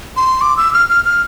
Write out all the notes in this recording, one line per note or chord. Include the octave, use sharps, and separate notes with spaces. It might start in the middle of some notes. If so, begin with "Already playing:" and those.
C6
D6
E6
F6
F6
F6